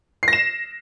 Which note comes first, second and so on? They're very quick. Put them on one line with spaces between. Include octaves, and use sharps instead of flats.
C7 A#6 E7